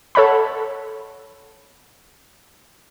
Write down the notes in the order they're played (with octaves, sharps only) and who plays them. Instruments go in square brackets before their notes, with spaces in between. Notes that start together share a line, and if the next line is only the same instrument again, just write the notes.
[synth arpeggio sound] A4 C#5 F#5 B5